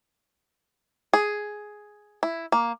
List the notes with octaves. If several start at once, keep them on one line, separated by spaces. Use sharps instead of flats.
G#4
E4
A#3